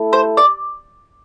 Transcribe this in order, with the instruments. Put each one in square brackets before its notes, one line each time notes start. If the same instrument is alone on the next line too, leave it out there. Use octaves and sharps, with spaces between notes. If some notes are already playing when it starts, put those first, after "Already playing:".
Already playing: [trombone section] A3 E4 A4
[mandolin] C5
D5